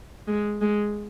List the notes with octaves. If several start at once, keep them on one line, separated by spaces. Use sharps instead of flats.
G#3
G#3